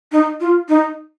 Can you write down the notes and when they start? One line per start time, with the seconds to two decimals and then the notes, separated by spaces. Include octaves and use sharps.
0.12 D#4
0.40 F4
0.69 D#4